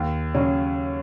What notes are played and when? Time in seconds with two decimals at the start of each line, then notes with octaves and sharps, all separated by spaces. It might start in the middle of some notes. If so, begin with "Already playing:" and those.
Already playing: D#2
0.35 C#3 F#3 C#4